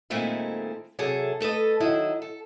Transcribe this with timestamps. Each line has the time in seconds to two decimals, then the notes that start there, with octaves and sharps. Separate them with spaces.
0.10 A#2 D#3 G#3 A3 C4 E4
0.99 C3 F#3 G#4 A4 E5
1.40 A3 A4 B4 D#5
1.80 D#3 F#3 E4 D#5
2.22 A4